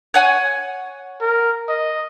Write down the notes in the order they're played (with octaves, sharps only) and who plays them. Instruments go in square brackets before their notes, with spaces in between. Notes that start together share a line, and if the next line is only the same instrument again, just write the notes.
[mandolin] C#5 F#5 G#5
[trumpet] A#4
D#5